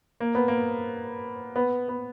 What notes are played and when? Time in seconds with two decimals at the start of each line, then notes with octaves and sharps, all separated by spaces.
0.20 A#3
0.35 B3
0.48 A#3
1.56 B3
1.89 B3